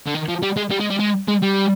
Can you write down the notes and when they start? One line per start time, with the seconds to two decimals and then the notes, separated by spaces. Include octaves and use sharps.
0.06 D3
0.14 D#3
0.28 F3
0.42 G3
0.56 G#3
0.71 G3
0.80 G#3
0.90 G3
0.99 G#3
1.28 G#3
1.42 G3